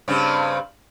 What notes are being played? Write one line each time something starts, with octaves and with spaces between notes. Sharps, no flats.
G2 C#3 C4